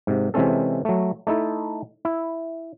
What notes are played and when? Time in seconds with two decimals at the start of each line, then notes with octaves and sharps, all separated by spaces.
0.07 G#2 C3
0.34 C3 E3 G#3 C4 C#4 A4
0.85 F#3 A3
1.27 A3 D#4 E4 A4
2.05 E4